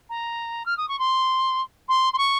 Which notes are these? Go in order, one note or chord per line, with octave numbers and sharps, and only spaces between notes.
A#5
F6
D#6
C#6
C6
C6
C6
C#6